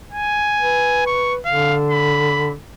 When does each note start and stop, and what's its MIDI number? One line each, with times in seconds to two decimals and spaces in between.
0.12 1.06 80
0.60 1.39 71
1.07 1.33 85
1.46 2.55 50
1.46 1.76 77
1.90 2.51 83